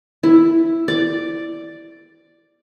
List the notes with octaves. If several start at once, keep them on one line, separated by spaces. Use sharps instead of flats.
E4
D5